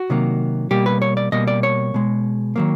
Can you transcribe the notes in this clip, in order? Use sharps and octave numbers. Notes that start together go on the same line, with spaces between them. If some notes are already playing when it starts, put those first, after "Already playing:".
Already playing: F#4
C3 D#3 F#3 A#3
B2 G3 A#3 G4
B4
C#5
D5
B2 G3 A#3 D#5
D5
C#5
B2 G#3
D#3 F#3 A#3